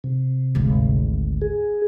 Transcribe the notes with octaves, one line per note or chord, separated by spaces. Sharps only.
C3
G#1 D2
G#4